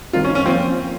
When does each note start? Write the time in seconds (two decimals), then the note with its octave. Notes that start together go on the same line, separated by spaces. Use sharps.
0.13 D#3 G3 C4 D#4 F4 A#4
0.25 C#4
0.35 C#4
0.45 F3 A#3 C4 F4 C5